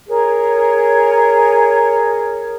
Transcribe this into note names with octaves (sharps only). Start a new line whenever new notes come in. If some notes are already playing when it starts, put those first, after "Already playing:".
G#4 A#4 C#5